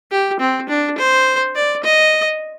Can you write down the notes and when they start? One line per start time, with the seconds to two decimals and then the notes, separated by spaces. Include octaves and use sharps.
0.11 G4
0.40 C4
0.69 D4
0.98 C5
1.55 D5
1.84 D#5